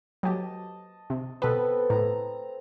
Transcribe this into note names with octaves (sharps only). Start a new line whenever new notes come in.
F#3 G4 D#5 A5
C3
B2 B3 C4 A4 B4
A2 A#5